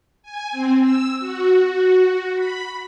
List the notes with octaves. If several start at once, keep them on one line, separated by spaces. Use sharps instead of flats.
G#5
C4
E6
F#4
B5